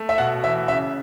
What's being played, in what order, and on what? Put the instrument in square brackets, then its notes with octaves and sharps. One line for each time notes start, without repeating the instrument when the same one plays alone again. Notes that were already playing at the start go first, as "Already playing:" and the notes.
Already playing: [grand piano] A3
E5
B2 F#5
E3 E5
C#3 E5